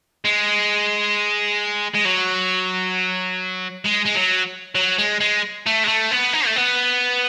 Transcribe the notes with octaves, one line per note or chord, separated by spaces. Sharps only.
G#3
G#3
F#3
G#3
G#3
F#3
F#3
G#3
G#3
A3
G#3
A3
B3
D#4
A3
B3